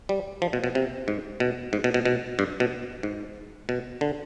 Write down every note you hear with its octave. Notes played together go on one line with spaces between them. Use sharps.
G3
F3
B2
B2
C3
G#2
B2
G#2
B2
B2
B2
G2
B2
G#2
B2
D3